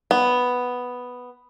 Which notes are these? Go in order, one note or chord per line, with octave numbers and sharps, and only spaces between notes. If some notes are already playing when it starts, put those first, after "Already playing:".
B3